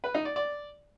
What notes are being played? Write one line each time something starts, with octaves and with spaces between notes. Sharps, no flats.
B4
D#4
D5
D5